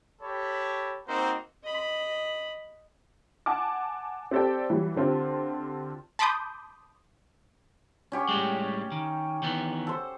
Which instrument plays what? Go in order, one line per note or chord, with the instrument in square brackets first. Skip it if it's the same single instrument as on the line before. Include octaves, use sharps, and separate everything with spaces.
[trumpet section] G4 A4 C#5 B5
A#3 C4 D#4 F#4 A#4 C5
[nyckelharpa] D#5 B5
[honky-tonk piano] F#5 G#5 A5 D6
C4 G4 A4 D5 G5
E3 F#3 G3 G4
D3 C4 F4 G4
[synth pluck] A5 B5 C6 D6 D#6 G6
[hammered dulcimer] C#4 G4 C#5
[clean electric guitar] A2 G3 G#3
D#3
D#3 E3 B3
[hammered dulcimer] A4 C5